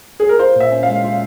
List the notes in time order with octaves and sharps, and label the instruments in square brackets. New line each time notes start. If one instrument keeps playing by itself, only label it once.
[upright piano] G#4
A#4
[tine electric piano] F4 [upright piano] C5
[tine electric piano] A#2 [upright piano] E5
[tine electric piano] C#4
[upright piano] F5
[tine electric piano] G#3
F4